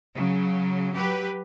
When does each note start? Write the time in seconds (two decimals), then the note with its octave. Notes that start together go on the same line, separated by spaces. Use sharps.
0.14 C#3 F#3
0.94 F#3 G4 B4